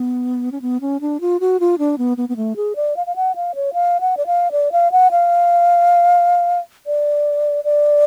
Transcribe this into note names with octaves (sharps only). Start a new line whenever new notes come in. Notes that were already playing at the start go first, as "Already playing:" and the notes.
Already playing: B3
C#4
B3
C#4
D4
F4
F#4
F4
D4
B3
B3
B3
A3
G#4
D5
F5
F5
F#5
F5
C#5
F5
F#5
D5
F5
D5
F5
F#5
F5
D5
D5